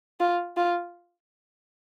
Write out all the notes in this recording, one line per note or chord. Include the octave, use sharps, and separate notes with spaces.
F4
F4